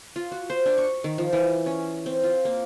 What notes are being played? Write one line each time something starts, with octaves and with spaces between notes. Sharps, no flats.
F4
F#4
C5
D4
C#6
D#3
F3
E3
C#4
C4
F4
A#3